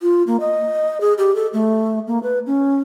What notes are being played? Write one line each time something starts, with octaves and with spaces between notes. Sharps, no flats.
F4
A#3
D#5
G#4
G4
A4
A3
A#3
B4
C#4